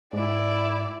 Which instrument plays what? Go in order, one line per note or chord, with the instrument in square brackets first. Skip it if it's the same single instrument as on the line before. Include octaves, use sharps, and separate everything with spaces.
[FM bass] G#2 [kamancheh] E4 D5